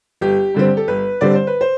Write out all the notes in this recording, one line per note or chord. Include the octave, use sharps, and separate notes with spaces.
G1 G4
G2 D3 G3 C4
A4
G1 B4
G2 D3 G3 C4 D5
C5
B4
C5